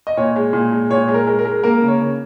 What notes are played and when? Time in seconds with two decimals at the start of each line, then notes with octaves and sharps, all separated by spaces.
0.07 D#5
0.17 A#2 C#5
0.36 G#3
0.53 A#2
0.72 G#3
0.90 A#2 C#5
1.08 G#3
1.14 A#4
1.27 G#3
1.39 A#4
1.45 G#3
1.63 A#3 A#4
1.82 C#3
1.88 C#5
1.99 C#3